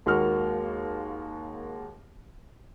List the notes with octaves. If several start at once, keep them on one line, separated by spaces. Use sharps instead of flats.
D#2 G#3 A#3 F#4 F6